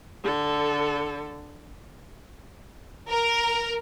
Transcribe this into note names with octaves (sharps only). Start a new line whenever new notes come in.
D3 A4
A#4